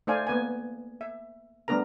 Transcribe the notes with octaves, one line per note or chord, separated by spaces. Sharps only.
A3 D#4 C5 D5 F5 G#5
A#3 B3 B4 G#5
E5
G3 A3 B3 D4 A#4 A#5